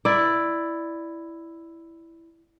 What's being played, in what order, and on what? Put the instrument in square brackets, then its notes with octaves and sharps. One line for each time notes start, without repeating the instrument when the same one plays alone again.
[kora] E4 D5